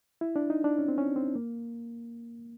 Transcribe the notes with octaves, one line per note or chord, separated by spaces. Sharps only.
E4
D4
D#4
D4
C#4
C4
C#4
C4
A#3